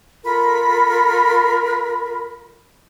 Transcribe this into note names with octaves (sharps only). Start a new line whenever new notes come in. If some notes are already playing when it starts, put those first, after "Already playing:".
F4 A4 A#4 B5